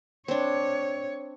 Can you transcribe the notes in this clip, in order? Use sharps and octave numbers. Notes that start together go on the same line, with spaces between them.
C4 D4 C#5